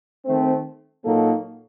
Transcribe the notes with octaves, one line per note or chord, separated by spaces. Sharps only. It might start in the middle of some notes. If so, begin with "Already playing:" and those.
D#3 A3 C4
A#2 F#3 A#3 D#4 A4